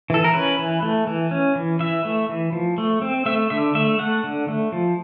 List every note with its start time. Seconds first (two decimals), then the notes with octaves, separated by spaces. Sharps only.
0.10 E3 A4
0.24 A#4
0.34 C#4 B4
0.59 E3
0.82 A3
1.07 E3
1.31 C#4
1.55 E3
1.80 E3 E5
2.05 A3
2.29 E3
2.52 F3
2.78 A3
3.02 C4
3.26 A3 E5
3.50 D3 E5
3.75 A3 E5
3.99 A3 F#5
4.24 D3
4.48 A3
4.72 F3